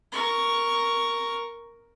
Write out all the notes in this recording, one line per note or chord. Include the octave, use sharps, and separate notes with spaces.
A#4 C#6